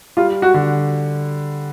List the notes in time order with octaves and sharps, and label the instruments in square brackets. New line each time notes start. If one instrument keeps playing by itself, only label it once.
[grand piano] G3 [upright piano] F4
[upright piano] F#4
[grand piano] D3